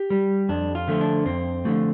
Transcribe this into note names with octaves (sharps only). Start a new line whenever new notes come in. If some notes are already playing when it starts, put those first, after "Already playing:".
Already playing: G4
G3
F2 D4
F4
D3 F3 A3
D4
F2 C4
D3 F3 A3